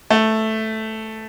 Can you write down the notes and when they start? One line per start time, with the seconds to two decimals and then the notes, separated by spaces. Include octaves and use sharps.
0.10 A3